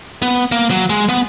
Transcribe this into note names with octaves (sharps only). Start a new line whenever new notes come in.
B3
A#3
F#3
G#3
B3